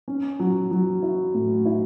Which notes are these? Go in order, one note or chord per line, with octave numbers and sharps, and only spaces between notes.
C#4
F#3
F#3
E4
A2
E4